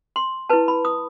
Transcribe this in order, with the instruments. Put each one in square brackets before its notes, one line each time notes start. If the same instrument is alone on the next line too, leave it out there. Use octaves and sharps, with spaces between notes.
[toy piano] C6
E4 B4 A5
B5
D#6